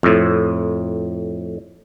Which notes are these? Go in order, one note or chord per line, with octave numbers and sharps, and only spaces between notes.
F2 A2